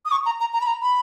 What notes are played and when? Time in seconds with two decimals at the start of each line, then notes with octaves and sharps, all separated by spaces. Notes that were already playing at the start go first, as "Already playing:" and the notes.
0.05 D#6
0.11 C#6
0.26 A#5
0.40 A#5
0.53 A#5
0.61 B5
0.67 A#5
0.82 B5